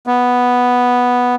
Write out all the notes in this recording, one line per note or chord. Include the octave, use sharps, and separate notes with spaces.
B3